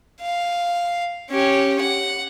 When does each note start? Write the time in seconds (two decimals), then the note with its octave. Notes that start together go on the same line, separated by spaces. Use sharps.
0.21 F5
1.30 C#4 G4
1.81 F#5